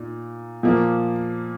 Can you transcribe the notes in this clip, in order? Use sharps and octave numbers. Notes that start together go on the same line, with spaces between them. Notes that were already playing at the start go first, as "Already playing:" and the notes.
Already playing: A#2 D#4
A#2 F3 A#3